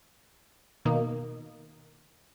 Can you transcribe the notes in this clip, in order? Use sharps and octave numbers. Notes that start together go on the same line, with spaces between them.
B2 D#3 A#3 D#4